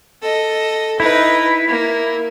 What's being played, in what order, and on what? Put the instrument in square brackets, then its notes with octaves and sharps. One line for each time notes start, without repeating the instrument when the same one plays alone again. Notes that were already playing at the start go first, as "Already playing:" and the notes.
[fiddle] A4 D#5
[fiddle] D#4 B4 [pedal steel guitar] E4
[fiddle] A#3